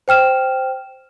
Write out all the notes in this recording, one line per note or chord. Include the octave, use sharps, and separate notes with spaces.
C5 G5 F6 E7